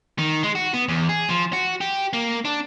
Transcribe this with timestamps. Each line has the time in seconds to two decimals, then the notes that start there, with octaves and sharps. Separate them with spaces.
0.19 D#3
0.43 G#3
0.55 F#4
0.74 B3
0.88 E2
1.09 G#4
1.29 F3
1.53 F#4
1.81 G4
2.13 A#3
2.45 D4